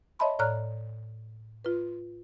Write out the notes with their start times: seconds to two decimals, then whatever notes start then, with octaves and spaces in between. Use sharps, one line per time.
0.19 C#5 D#5 E5 A5 B5 C6
0.39 A2 C#5 D5 A#5 F6 F#6
1.65 F4 B4